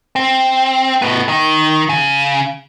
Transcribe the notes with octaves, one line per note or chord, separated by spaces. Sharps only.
C4
A2 B3
D#3
C#3